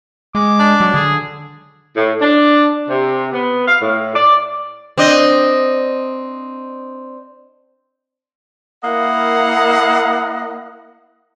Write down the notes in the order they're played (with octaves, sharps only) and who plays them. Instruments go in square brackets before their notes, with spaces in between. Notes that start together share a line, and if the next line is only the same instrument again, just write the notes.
[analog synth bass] G#3 [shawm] D6
[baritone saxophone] D4
[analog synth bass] F#3
[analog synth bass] D3 [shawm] G#4
[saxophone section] A2
D4
C3
B3
F5
A2
D5
[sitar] C4 D4 D#5
[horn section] A#3 E4 A#4 D#5 F5 F#5